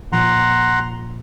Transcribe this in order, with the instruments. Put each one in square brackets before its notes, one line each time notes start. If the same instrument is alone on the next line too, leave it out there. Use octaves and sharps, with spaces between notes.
[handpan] A#2 F3 [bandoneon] F#5 A#5 C6